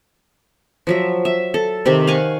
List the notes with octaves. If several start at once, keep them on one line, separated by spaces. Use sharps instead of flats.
F3 F#3 E5
E5
A4
C3 D#3 G4
F5 F#5 G#5 C#6